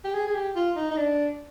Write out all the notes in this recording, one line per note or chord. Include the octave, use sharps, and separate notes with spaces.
G4
G#4
G#4
G4
F4
D#4
D#4
D4